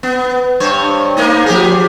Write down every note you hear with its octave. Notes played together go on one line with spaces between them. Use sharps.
B3
G2 C5 C#5
A3 A#3 D#4
F3 G4 G#4